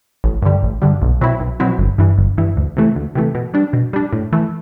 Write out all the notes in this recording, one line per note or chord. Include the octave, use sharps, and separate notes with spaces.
A1
G2 D3 G3
A1
G2 D3 G3
B1
B2 F#3 C4 E4
B1
B2 F#3 C4 E4
G1
G2 E3
G1
G2 E3
D2
C3 E3 A3
D2
C3 E3 A3
B2
G3 D4
B2
G3 D4
A2
E3 A3